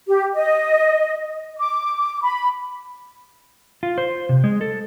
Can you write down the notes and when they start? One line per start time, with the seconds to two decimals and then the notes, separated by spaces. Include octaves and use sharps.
0.07 G4
0.35 D#5
1.59 D6
2.23 B5
3.83 F4
3.98 C5
4.29 C3
4.44 G#3
4.61 A4